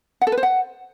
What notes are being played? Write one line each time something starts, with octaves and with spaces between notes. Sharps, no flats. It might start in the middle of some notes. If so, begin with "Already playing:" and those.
F#5
A4
B4
C5
F#5